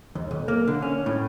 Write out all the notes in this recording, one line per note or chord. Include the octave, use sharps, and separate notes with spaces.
D#2
B1
A#3
D3
C#4
A2